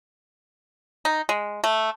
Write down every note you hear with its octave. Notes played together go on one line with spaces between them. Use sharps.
D#4
G#3
A3